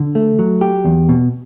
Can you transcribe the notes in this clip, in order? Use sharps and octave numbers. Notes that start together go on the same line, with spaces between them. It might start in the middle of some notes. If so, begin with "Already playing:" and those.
Already playing: D3
A3
F#3
G4
E2
B2